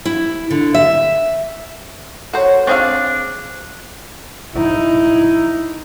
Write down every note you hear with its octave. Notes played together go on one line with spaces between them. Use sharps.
E4
D3
E5
F#4 A4 C5 C#5
C4 D4 G#4 F5 C#6
D#4 E4